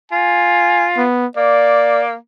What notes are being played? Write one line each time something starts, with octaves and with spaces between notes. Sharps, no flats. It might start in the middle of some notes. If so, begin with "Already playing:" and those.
F4 G#5
B3
A#3 D5